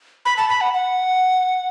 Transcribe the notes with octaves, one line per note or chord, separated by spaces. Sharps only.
B5
A5
B5
F#5
F#5